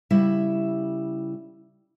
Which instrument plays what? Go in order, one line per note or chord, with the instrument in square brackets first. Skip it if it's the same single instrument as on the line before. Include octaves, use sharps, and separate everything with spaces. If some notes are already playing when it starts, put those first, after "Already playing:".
[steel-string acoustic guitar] C#3 G3 E4 E5